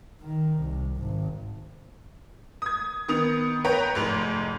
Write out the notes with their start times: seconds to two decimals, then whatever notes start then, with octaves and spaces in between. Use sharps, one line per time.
0.22 D#3
0.60 C2
0.97 G#1
2.62 D#6 G#6
3.08 D#3 B3 D#6 F7
3.65 B4 C#5 G5 A#5
3.95 F1 G#2 F7